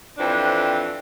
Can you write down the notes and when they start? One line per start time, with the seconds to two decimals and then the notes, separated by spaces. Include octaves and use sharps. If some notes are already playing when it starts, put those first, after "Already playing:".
0.18 F2 E3 C4 D4